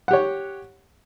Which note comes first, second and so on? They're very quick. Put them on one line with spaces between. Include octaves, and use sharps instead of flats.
F#5 G4 C#5